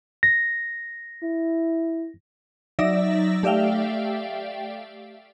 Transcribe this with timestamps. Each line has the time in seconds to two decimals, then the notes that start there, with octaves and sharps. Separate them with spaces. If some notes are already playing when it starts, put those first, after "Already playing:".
0.23 A#6
1.23 E4
2.79 F#3 D#4 D5 E5 E6 A#6
3.43 A3 G4 D5 E5 F5 G5